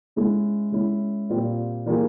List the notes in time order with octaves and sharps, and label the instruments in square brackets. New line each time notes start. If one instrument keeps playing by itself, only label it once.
[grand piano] G#3 C#4 E4
G#3 C#4 E4
A#2 G3 C4 F4
E3 G3 A#3 F4 G#4